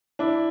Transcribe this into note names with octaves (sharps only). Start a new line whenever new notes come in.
D4 E4